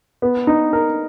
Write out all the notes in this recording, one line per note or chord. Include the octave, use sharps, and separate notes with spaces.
B3
D#4
A#4